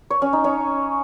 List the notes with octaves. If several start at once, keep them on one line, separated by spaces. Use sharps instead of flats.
C#5
C#4
D#4
C#4